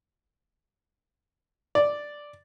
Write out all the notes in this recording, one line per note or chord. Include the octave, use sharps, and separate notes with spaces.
D5